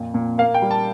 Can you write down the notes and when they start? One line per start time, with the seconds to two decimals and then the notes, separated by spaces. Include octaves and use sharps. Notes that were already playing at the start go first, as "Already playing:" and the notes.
Already playing: F2 A#2
0.14 A#2
0.38 A#3 F5
0.54 G5
0.62 G3
0.71 A5